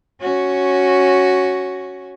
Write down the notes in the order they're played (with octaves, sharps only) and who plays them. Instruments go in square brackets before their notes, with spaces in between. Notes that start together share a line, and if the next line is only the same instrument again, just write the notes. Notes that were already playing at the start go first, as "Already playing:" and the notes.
[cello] C#4 F#4